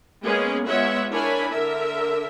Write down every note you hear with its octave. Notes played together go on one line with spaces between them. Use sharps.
G#3 A#3 B3 C#4 G#4
G#3 B3 F4 C#5 E5 F#5
D4 E4 A#4 C#5 G#5 B5
D3 A#4 E5